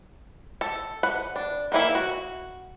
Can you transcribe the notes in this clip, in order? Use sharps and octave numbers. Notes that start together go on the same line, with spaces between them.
A4
B4 F#5
D4
D#3 E3 A#3 E4
F#4